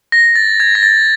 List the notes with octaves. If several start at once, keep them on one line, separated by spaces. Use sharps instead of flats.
A#6
A6
G#6
A#6
A6